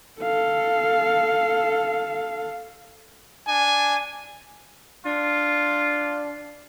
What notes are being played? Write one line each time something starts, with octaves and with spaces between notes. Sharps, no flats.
A4 F5
D4 G#5
D4 F4